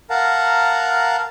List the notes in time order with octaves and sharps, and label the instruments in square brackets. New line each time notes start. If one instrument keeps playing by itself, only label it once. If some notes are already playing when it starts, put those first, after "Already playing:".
[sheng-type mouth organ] A#4 F5 F#5 A5 A#5